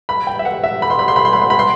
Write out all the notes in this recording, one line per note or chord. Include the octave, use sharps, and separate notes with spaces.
B5
G5
E5
F#5
E5
B5
C6
B5
C6
B5
C6
B5
C6
B5
C6